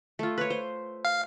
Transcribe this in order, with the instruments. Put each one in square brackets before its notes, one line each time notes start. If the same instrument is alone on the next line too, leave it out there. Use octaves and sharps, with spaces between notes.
[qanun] A3 F4
B4 C#5
C5
[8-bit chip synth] F5